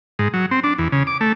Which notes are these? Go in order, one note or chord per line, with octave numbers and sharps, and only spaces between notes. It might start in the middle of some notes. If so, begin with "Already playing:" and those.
G#2
F#3
C4
D4
E2
C#3
D6
A3